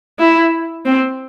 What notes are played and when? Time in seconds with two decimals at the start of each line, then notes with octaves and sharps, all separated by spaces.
0.19 E4
0.85 C4